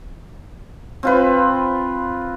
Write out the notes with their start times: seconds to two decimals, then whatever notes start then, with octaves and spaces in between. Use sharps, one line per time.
1.03 C4 F4 B4